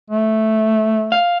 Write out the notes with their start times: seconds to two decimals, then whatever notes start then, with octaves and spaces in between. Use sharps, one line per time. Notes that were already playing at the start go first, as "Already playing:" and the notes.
0.10 A3
1.12 F5